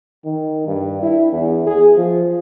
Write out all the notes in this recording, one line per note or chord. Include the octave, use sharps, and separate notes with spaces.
D#3
G2
E4
E2
G#4
F3